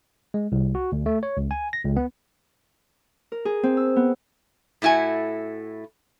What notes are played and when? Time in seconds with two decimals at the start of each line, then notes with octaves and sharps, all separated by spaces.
0.34 G#3
0.52 C2
0.75 F#4
0.92 D2
1.06 A3
1.23 C#5
1.37 C#2
1.51 G#5
1.73 A#6
1.85 C#2
1.97 B3
3.32 A#4
3.45 G#4
3.63 C4
3.77 E6
3.96 B3
4.82 A2 A3 E4 F#4 G#5